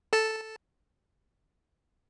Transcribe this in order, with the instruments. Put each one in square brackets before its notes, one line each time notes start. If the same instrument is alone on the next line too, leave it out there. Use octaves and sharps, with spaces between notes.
[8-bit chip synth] A4 A5